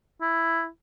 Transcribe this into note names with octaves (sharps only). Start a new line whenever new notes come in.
E4